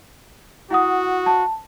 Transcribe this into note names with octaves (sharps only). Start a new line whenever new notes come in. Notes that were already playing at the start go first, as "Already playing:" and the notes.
E4 F#4 F#5 D#6
A5